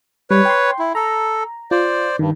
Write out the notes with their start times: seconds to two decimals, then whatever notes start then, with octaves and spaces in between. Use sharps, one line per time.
0.30 G3 B4 C#5
0.45 G5 C6
0.79 E4
0.95 A4 A#5
1.71 F4 C5 D5
2.19 G2 D#3